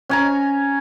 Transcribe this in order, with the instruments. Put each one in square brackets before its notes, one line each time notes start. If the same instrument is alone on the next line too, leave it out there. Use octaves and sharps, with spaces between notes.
[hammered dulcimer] C#4 G#5 A#5